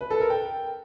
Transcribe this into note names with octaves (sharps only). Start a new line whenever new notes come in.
B4
A4
A#4
G5